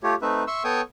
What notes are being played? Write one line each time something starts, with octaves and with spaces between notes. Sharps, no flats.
A3 F4 G4 C#5
A3 C4 D#4 B4 E5
E5 C6 C#6 E6
B3 A4 C#5 G5 C#6 D#6